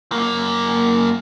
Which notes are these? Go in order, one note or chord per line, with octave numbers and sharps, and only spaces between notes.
F#2 A#3